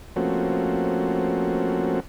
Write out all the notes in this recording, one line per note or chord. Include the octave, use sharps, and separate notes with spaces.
F3 A3 A#3 C4 C#4 F#4